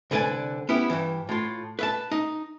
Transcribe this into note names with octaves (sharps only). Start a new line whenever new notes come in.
C2 D3 B4 D5 G#5
B3 C#4 E4 G4
G2 E3
A2 F4
B4 E5 A5
D#4